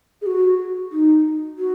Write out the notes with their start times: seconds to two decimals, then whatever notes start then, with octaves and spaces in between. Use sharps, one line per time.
0.21 G#4
0.26 F#4
0.92 D#4
1.58 F#4